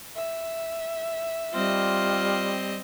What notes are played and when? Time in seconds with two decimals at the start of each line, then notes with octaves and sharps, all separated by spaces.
0.16 E5
1.54 G3 C4 F4 D#5